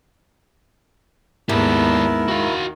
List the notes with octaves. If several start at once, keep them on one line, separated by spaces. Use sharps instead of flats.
D#2 G#2 G#3 B3 E4 G4 A#4 A5
D#3 F#4 F5